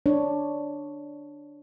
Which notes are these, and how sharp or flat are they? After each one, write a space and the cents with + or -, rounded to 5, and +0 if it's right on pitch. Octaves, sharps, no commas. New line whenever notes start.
D4 +0 C#5 +0